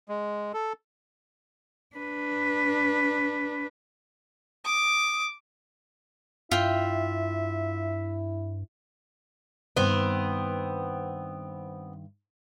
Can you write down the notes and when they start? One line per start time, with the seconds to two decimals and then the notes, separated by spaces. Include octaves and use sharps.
0.09 G#3
0.54 A4
1.96 D4 B4
4.65 D6 D#6
6.51 G2 E4 F4 E5 G5
9.77 G2 D#3 B3 C4